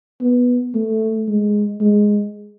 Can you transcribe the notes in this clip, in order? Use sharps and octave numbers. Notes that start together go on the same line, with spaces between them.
B3
A3
G#3
G#3